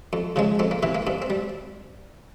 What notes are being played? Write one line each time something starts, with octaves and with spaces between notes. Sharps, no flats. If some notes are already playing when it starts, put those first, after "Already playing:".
F2
C#3 F3 G#3
F2 C4
A#3
C3 E3 C4
A#3
G2 C4
C4
G3